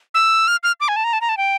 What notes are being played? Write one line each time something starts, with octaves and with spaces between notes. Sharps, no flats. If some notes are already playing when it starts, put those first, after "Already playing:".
E6
F6
F6
D6
G#5
A5
A#5
A5
A#5
A5
G5